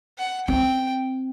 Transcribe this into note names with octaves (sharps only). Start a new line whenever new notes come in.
F#5
C4 G5